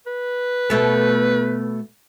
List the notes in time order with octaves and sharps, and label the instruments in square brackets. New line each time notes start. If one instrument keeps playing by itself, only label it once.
[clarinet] B4
[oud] B2 A3 B3